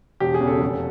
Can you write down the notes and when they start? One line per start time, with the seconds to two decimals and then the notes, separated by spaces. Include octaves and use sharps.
0.20 E1 G4
0.34 G#4
0.40 E2 C#3
0.47 A4
0.61 F1